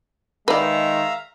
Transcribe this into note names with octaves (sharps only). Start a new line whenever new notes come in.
D#3 G#3 B4 D5 E5 F5 A#5